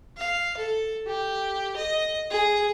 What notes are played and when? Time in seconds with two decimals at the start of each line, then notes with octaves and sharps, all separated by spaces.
0.17 F5
0.57 A4
1.07 G4
1.77 D#5
2.30 G#4